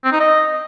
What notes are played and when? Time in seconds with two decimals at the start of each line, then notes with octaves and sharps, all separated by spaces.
0.04 C4
0.12 D#4
0.20 D#5